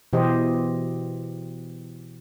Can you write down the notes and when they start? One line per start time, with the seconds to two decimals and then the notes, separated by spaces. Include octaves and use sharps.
0.13 B2 E3 G4 C5 D#5